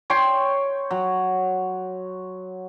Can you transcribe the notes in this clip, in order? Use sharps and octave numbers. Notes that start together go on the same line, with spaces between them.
C#5 G5 C6
F#3